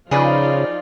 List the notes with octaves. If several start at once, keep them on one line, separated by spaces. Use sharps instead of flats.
C#3 F3 D#4 F4 G#4 B4 D5